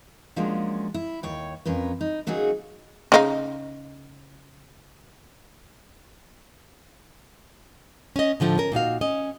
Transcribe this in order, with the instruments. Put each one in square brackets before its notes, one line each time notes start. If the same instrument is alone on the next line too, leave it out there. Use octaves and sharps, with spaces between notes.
[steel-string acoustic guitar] F3 F#3 G#3 A#3 C#4 D4
E4
D#2 C#5 G5
F2 C#4 A#4 B4
D#4
C#3 F#3 A#3 D#4 F#4 G#4
[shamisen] C#3 D#4 F5
[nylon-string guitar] C#4 D#5
A2 D3 F3 A3
C#4 A#4
A#2 D#4 F#4 F5
C#4 D#5